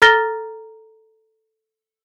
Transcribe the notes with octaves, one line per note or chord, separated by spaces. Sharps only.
A4 A#5 F6 A6 A#6 G7